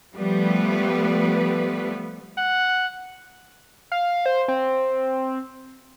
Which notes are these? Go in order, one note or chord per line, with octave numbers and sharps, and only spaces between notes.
F3 G3 A3 B3 B4
F#5
F5
C5
C4